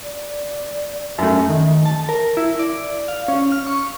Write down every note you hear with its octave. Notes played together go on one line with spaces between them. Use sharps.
D5
F#2 A3 E5
D#3
A5
A#4
E4
D5
F5
C#4
F6
C#6